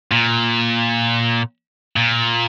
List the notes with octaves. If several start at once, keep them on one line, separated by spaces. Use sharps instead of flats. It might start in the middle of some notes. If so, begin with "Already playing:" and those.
A#2
A#2